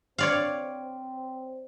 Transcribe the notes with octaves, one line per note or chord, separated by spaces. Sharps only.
C4 C#5 D5 F5